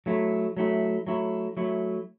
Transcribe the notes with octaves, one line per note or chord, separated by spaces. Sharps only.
F#3 A3 E4
F#3 A3 E4
F#3 A3 E4
F#3 A3 E4